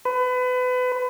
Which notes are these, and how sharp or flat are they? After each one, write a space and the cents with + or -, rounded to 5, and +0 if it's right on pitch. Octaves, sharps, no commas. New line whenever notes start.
B4 +30